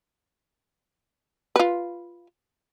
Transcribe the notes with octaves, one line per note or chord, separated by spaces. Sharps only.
F4 B4